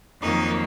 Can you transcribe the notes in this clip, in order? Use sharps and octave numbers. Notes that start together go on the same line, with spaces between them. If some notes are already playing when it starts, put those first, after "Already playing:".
F2 D#3 F#3 A#3 D#4